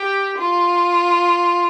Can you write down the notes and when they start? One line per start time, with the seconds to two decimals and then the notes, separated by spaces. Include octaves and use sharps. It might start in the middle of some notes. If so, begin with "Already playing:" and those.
Already playing: G4
0.38 F4